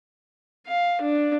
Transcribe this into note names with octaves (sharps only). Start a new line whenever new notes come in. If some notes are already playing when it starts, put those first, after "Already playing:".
F5
D4